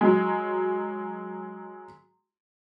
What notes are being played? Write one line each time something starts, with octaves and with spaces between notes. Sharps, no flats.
F#3 G#3